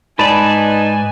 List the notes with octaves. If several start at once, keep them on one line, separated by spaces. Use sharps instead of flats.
G#2 D#4 B4 D5 G#5 A5